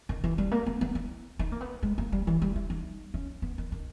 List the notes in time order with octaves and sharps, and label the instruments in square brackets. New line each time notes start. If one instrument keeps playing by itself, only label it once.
[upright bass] D#3
E3
G3
A#3
B3
B3
E4
D#4
A#3
B3
G#3
A#3
G3
E3
G3
E4
D#4
C#4
B3
D#3
D#3